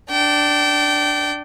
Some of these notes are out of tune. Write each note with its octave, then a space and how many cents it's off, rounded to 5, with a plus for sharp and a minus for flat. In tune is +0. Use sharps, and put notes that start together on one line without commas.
D4 +0 G5 -25